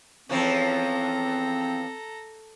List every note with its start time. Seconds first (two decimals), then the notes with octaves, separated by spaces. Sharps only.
0.29 E2 F3 C4 C#4 A4 A#5